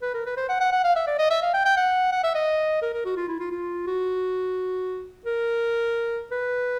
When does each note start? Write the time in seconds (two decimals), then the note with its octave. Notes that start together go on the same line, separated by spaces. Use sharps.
0.02 B4
0.14 A#4
0.26 B4
0.37 C5
0.49 F#5
0.60 F#5
0.72 F#5
0.84 F5
0.96 E5
1.07 D5
1.19 D#5
1.30 E5
1.42 F5
1.54 G5
1.65 G5
1.77 F#5
2.12 F#5
2.24 E5
2.35 D#5
2.82 A#4
2.93 A#4
3.05 F#4
3.16 F4
3.28 E4
3.40 F4
3.51 F4
3.87 F#4
5.26 A#4
6.31 B4